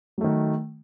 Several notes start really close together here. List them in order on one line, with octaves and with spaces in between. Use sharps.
F#3 A3 D#3